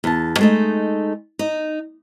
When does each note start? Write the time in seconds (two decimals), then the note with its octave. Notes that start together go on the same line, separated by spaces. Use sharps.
0.04 E2 A5
0.39 G#3 A3 D#4
1.39 D#4